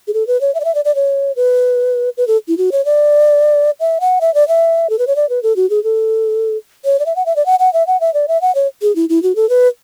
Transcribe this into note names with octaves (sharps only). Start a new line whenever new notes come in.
G#4
A4
B4
C#5
E5
D5
E5
D5
D5
C#5
B4
B4
A4
E4
F#4
C#5
D5
E5
F#5
E5
D5
E5
A4
B4
C#5
D5
B4
A4
F#4
G#4
A4
C#5
D5
E5
F#5
E5
D5
F#5
F#5
E5
F#5
E5
D5
E5
F#5
C#5
G#4
E4
E4
F#4
A4
B4